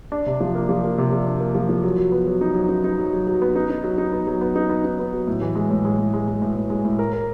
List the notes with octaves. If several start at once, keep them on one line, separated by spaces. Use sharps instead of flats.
D4
C3
F3
A#3
F3
A#3
C3
F3
D4
A#3
F3
F3
F#3
F#3
B3
F#3
D#4
F#3
D#4
D#4
F#3
F#3
F#3
B3
D#4
D#4
F#3
D#4
B3
F#3
B3
D#4
B3
D#4
B3
F#3
A2
E3
G#3
A2
G#3
A2
G#3
G#3
A2
A2
G#3
A2
A#4
A#4